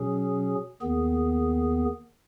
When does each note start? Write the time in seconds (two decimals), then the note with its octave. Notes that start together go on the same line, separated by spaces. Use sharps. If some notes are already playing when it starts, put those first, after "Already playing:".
Already playing: B2 F#3 C#4 G#4
0.81 D#2 D#3 B3 G#4